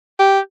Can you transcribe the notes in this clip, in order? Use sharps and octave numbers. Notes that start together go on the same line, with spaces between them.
G4